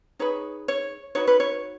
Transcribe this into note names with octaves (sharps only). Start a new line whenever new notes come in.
D#4 G#4 B4 C#5
C#5
D#4 F#4 B4 C#5
B4
C#5